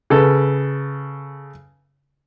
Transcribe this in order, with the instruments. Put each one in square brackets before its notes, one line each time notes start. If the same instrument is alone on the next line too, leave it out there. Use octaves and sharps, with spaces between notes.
[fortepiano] C#3 A4 B4